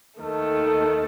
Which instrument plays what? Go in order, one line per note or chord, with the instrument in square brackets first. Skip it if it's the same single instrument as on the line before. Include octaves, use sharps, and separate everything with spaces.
[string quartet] D#2 D#3 A3 [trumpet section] A4